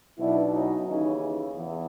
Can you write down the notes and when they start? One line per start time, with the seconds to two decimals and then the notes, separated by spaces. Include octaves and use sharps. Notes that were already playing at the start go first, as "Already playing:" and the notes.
0.18 B1 B2 D4 E4
0.53 C#4 D#4
0.87 D#2 C#3 E3 C#4 D#4
1.56 E2